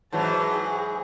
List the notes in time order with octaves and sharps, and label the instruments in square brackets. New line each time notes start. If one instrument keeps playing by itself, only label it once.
[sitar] G#2 E3 F#3 [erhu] A5
[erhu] G#4